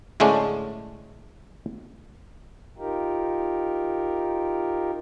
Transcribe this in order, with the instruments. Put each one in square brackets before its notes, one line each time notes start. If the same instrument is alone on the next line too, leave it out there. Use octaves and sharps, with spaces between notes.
[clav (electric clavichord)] A2 D3 G#3 A3 C#4 D4
[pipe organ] D#4 F4 G4 A#4